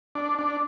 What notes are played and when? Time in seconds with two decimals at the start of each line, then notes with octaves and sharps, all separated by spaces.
0.15 D4
0.39 D4